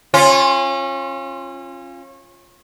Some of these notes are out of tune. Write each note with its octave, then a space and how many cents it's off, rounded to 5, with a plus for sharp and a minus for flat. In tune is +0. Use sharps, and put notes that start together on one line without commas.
C#4 -30 F4 +0